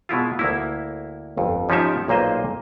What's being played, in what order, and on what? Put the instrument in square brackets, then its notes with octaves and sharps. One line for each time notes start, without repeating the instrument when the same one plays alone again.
[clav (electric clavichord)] B2 G#3 E4 F4
D2 A#3 E4
G1 F2
G#2 F3 C#4 D#4 G4 E5
B1 A#2 A#3 C5 D#5